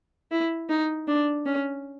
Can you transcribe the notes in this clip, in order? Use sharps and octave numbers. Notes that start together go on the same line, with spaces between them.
E4
D#4
D4
C#4